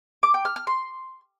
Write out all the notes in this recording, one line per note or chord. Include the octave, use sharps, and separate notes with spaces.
D6
G5
F6
F6
C6